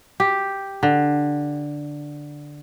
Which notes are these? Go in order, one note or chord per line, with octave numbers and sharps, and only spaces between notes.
G4
D3